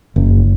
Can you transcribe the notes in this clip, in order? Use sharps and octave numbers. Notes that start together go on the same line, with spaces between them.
F#1